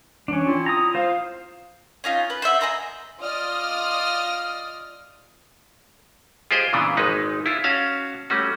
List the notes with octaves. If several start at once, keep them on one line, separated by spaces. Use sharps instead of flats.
E3 C#4 D4
C4 E4 F4
A#5 D#6
F4 C5 F5
C#4 D#4 F4
B4
C5 C#5 E5 F#5
D#5 G#5 A#5 C6
F4 D5 D#5 D#6 F6
F4 G4 G#4 C5 D#5
A#2 C#3 E3 B3 D4
G#1 G#3 D#4 B4
E4 F4
C#4 F#4 F5 A5
G3 A3 C#4 F#4